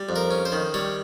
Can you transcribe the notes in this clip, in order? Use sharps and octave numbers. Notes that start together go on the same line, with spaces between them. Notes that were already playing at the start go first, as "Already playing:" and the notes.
Already playing: G3
F2
A#4
C#4
C5
D#3
G3 C#5